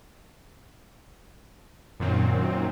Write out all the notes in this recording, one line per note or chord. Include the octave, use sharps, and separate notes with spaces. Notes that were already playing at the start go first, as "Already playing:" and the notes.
F#2 A#2 D#3 F#3 C4